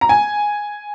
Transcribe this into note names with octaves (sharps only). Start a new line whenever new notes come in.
A#5
G#5